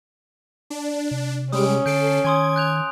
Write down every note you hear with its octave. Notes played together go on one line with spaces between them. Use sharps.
D4
C3
G3 G#3 C#4 D#6 D7
D3 A4 G6 C7 D7
D#3 G#5 C6 D#6 G#6
F#6 G6 F7